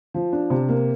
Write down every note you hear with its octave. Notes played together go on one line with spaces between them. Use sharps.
F3
D4
C3
A#3